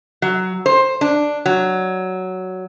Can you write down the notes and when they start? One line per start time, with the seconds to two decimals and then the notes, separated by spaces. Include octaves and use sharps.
0.22 F#3
0.66 C5
1.01 D4
1.46 F#3